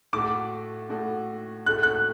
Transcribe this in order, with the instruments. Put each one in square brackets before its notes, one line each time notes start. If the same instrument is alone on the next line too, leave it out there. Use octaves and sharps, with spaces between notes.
[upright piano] A2 A3 F#4 A4 [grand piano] D6
[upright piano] A2 A3 F#4 A4
[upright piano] A2 A3 F#4 A4 [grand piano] F#6
[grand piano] F#6